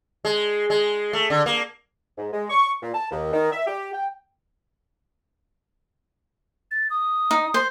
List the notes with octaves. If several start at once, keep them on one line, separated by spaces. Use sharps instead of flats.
G#3
G#3
A3
D3
A#3
G#2
G#3
C#6
A#2
A5
D#2
D#3
E5
G4
G5
A6
D#6
D#4
C5